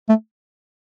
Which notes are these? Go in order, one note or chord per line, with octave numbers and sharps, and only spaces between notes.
A3